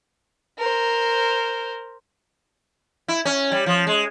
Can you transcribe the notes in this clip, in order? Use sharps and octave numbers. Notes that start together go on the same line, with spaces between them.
A#4 C5
E4
C#4
G3
F3
G#3